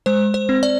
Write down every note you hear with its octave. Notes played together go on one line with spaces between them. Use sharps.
G#3 C5
C5
C4
D5